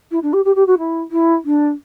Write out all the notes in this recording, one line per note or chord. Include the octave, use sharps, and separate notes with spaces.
E4
D4
G4
G4
G4
F#4
E4
E4
D4